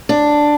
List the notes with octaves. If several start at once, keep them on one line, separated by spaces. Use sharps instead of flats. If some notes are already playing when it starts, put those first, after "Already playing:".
D4